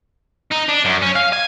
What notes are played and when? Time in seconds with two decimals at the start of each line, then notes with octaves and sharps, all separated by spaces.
0.52 D#4
0.69 D4
0.85 F#2
1.02 C#4
1.16 F5
1.33 G#5